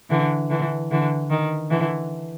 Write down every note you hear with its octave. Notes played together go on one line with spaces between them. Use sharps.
D3 E3
D3 E3
D3 E3
D#3
D3 E3